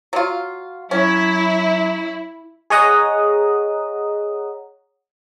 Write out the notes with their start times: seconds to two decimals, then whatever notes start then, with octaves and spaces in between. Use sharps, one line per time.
0.13 F#3 F4
0.91 F#3 C#4 E4
2.70 G#4 C#5 D#5 F#5 A#5 D#6